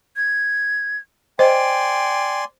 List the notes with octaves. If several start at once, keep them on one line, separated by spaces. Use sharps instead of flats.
G#6
C5 D5 D#5 G5 G#5 C6